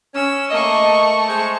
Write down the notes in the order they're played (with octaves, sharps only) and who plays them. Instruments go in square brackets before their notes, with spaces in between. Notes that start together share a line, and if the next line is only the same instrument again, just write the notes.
[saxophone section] C#4 [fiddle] E6
[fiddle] A3 C#6 [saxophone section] A#3 D#5
[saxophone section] G#3 C5